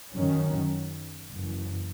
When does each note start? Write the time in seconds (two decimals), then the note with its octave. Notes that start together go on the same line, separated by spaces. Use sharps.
0.13 F#2 D#3 F#3 C#4
1.32 F#1 F#2 E3